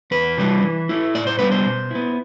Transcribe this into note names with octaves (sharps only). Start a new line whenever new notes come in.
E2 B4
C3 E3 G3 D4
E3
A3 E4
A2 D5
C5
G3 B3 D4 B4
C5
B2
B3 E4